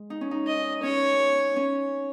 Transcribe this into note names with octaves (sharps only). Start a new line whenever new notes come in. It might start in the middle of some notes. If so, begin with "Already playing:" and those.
Already playing: G#3
D#4
C#4
D#4
D#5
C#4 C#5
C#4